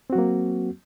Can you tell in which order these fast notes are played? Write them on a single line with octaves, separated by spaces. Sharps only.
C4 F#4 F#3 A#3